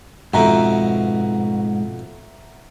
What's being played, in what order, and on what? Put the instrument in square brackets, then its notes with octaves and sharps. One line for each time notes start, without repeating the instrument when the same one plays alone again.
[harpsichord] F2 B2 [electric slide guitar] G#2 [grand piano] E5 F#5 A#5